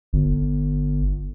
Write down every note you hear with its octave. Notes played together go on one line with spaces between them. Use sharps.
G1